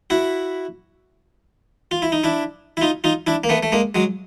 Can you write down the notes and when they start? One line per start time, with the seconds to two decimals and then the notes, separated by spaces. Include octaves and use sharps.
0.10 E4 F#4
1.91 F4
2.02 E4
2.12 D#4
2.24 D4 E4
2.77 E4
2.81 D#4 F4
3.04 D#4 F4
3.27 D4 E4
3.44 A#3
3.49 A3 B3
3.63 A3
3.72 G#3 A#3
3.95 F#3 G#3